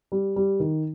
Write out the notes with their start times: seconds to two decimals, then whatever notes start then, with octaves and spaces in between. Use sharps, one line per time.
0.12 G3
0.36 G3
0.60 D#3